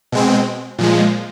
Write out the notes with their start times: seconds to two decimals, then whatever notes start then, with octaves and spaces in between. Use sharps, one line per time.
0.12 B2 G#3 C4
0.78 A#2 F3 G#3